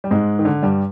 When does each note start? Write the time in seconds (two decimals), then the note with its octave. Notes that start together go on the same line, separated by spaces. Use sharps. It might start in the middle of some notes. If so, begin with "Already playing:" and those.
0.04 G3
0.11 G#2 G#3
0.39 D#3
0.45 D3
0.63 G2 G3